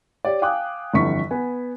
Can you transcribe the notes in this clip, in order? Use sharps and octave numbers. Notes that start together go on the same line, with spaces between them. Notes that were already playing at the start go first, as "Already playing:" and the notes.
G4 C#5 D5
F5 G5 G#5 D6 D#6 F#6
G1 F2 D3 E3 C#6 B6
B3 G#5